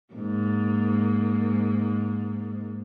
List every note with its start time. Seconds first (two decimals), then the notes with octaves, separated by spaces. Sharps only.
0.14 G#2 A#3